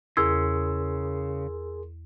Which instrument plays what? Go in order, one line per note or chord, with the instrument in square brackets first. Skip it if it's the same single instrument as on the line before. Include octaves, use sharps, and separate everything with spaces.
[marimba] E2 [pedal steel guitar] C#3 [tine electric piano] G#4 A#4 C6 [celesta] E6 G#6